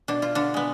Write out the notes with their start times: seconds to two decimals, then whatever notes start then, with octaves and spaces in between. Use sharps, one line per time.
0.08 B2 D4
0.22 F4
0.35 D3 D4
0.54 G#3 B3